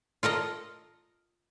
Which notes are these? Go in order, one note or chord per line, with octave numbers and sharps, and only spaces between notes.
F4 A4 A#4 D#5